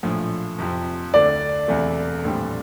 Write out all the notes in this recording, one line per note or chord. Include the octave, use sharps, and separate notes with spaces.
A#1 A2 F3
F2 C3 F3 C4
D2 D3 A3 D5
E1 E2 C3 E3 A3
A#1 A2 G3 C4